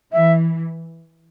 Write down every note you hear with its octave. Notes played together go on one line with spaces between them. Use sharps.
E3 E5